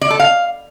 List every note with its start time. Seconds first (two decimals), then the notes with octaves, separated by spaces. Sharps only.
0.01 D5
0.10 A4
0.20 F5